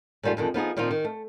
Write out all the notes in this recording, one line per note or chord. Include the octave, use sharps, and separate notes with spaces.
G#2 D#3 G3 A3 F4
F2 D3 D#3 G#3
F3 B3 D#4 G#4
A#2 D#3 F3 C4 D#4 F4
D#3
A3